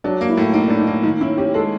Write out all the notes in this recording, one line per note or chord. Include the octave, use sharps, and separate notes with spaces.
F#3 D4
A#3
E4
A2
A#3 D#4
A2 D4
D#4
A#3
D#3 D#4
C#4 E4
C#4 G4
G#3 A4